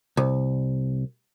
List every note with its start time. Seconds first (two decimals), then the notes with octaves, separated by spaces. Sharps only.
0.17 C2